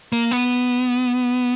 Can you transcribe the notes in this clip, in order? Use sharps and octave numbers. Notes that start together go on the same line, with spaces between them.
A#3
B3